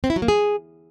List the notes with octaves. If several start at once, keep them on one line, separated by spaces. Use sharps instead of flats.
C4
E4
F#3
A#3
G#4